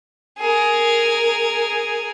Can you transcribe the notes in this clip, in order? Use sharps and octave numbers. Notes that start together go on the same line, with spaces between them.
G#4 A#4